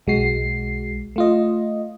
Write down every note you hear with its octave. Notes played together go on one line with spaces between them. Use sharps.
B1 G#3 F#4 C7
A3 F4 D#5